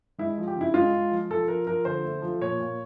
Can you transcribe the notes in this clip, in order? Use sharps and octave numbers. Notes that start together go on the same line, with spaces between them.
G#3 E4
F3
G4
C#3 E4
G#3 F4
G#3
F3
F3 A4
F3 A#4
F3 A#4
D3 C5
A3
F3
A#2 C#5
A#2